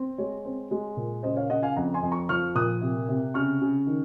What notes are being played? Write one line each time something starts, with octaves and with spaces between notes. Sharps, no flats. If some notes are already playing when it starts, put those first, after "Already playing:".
Already playing: C4
G#3 C#5
C4
G#3
A#2
C#3 C5 D#5
C#5 F5
C#3 D#5 F#5
F5 G#5
F2 F#5 A#5
G#5 C6
F2
A#5 C#6
F3 C#6 F6
A#2 D#6 F#6
C3
C3
C#3 C#6 F6
C#3
D#3